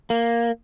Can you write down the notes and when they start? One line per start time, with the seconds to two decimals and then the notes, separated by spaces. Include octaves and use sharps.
0.10 A#3